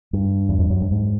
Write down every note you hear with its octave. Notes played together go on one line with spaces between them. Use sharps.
G2
E2
F2
F#2
G2
G#2